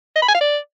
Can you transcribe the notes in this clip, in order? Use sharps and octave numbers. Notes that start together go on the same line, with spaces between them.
D#5
B5
G#5
F5
D5